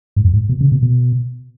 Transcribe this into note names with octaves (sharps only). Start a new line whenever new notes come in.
G#2
F#2
G#2
B2
C#3
B2
B2